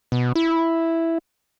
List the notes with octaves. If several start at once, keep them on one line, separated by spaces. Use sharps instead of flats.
B2
E4